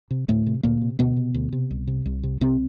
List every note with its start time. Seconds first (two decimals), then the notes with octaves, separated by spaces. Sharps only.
0.11 C3
0.28 D2 A2 A3
0.46 C3
0.63 D2 A#2 A#3
0.81 C3
0.99 D2 B2 B3
1.17 C3
1.34 D2
1.53 C3
1.71 C2
1.87 C3
2.06 C2
2.23 C3
2.41 C2 C3 C4